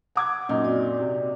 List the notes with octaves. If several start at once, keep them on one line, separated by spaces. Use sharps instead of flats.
F#5 D6 G#6
F#2 A#2 D#4
C4 F#4 D5
C3